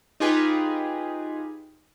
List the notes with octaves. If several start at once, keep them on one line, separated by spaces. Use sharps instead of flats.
D#4 F4 G4 G#4 B4